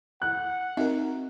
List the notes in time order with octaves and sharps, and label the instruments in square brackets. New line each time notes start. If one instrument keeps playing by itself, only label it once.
[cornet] F#5 [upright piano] F#6
[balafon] C4 E5 [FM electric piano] D#4 F#4 A#4